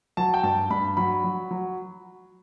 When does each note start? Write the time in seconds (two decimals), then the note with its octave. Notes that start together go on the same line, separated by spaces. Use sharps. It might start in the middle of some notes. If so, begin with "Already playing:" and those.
0.17 F#3 A5
0.34 G5
0.43 G2 A5
0.70 G2 B5
0.97 F#3 B5
1.24 F#3
1.51 F#3